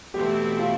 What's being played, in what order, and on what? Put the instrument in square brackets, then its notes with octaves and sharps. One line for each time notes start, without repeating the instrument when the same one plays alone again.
[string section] E2 B2 A3 C4 E4 [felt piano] G4
[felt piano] F4